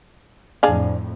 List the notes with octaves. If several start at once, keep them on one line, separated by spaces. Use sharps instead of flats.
F2 A2 D4 G#4 F5